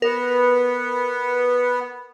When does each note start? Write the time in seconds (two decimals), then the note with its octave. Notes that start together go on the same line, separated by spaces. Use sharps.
0.02 B3 A#4